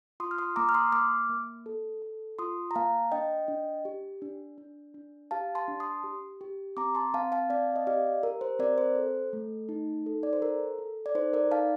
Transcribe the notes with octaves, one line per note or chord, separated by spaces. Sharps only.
F4 C6 D#6
F6
C6 D#6
A#3 A#5 D6
F6
C6 D#6
A#3 D6 F6
A#3
A4
A4
F4 C6 D#6
A#5
A#3 F5 A5
D4 D#5 G5
D4
G4
D4
D4
D4
G4 F5 A5
A5 C6
D4
C6 D#6
G4
G4
C4 A#5 D6
A5 C6
C4 F5 A5
F5 A5
C4 D5 F5
D#5
G4 D5 F5
G4 A#4
C5
C4 A#4 D5
C5
A4
A3
D#4
A4
D5
C5
A4 A#4
A4
D5
D#4 C5
A#4 D5
D#4 F5 A5